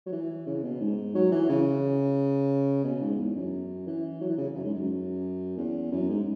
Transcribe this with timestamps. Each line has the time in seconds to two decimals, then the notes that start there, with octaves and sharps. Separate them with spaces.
0.06 F#3
0.12 E3
0.47 C#3
0.63 B2
0.80 G#2
1.15 F#3
1.32 E3
1.49 C#3
2.84 B2
3.02 G#2
3.19 E2
3.36 F#2
3.87 E3
4.21 F#3
4.30 E3
4.38 C#3
4.55 F#2
4.65 G#2
4.74 F#2
5.57 E2
5.91 F#2
6.09 G#2